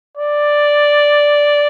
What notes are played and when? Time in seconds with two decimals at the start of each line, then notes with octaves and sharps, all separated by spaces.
0.17 D5